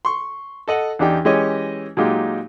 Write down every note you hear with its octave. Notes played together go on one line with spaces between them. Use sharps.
C6 C#6
A4 D#5 F#5
E2 D4 D#4 G4 G5
E3 G#3 C#4 G4 C#5 D#5
A#2 F#3 G#3 D#4 F4 G4